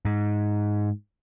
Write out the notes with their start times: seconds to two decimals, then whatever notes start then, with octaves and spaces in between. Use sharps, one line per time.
0.05 G#2